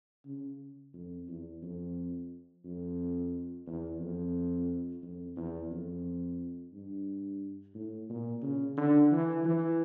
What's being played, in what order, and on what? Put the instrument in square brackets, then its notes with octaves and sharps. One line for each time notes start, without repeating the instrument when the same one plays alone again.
[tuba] C#3
F2
E2
F2
F2
E2
F2
F2
E2
F2
G2
A2
A#2
C#3
D3
E3
E3